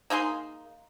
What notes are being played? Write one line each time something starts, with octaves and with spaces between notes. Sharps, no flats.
A#3 D#4 G#4 C6